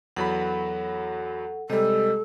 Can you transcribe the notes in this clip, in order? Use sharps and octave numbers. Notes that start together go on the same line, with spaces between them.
E2 F#3 A4 F#5 B5
C3 G3 G#3 G4 A4 D#5